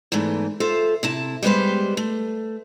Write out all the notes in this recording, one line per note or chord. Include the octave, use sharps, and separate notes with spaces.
E2 G#2 E3 A3
F4 A4 C5 E5
C3 E4 A5
G3 G#3 B3 G4 B4 C5
A3